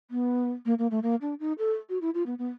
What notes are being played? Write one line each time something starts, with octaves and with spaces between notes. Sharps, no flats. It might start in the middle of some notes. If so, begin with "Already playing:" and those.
B3
A#3
A#3
A3
A#3
D4
D#4
A4
F#4
E4
F4
B3
B3